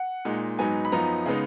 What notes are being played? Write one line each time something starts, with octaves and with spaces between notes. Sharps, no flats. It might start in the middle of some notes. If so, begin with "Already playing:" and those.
Already playing: F#5
A#2 G#3 D#4
G#2 F#3 B3 D#4 G#5
B5
F#2 F3 B3 D#4 A#5
C#3 G#3 B3 D#4